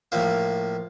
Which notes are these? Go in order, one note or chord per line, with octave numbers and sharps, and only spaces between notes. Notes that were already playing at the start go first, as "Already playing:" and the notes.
A2 F3 A#3